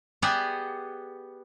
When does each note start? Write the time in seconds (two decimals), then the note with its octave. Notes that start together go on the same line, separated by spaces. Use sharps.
0.22 B3 G4 G#4 D5 E5 F#5